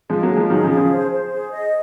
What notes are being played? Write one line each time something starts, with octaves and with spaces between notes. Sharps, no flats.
F3 G#3 G#4
F#3 A#3
G#4
F3 G#3
D#3 F#3 G#4
C#3 F3
G#4
C#3 F3
C5
C5
G#4
D#5